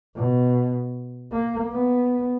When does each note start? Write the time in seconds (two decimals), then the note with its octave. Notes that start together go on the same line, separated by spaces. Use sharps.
0.16 B2
1.32 A#3
1.71 B3